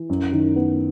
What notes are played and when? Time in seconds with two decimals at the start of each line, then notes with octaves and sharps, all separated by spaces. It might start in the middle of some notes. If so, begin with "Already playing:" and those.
Already playing: E3
0.09 F#2
0.33 D#3
0.56 B3